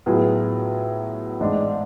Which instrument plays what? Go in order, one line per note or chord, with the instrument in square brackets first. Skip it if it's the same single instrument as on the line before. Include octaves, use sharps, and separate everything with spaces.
[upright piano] A2 F#3 B3 F4 G#4
A1 G#2 G#3 D4